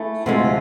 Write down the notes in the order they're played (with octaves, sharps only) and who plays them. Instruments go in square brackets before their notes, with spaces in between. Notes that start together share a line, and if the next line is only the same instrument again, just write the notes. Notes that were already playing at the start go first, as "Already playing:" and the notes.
Already playing: [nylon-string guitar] A3 E4 G#4
D2 C3 F3 G#3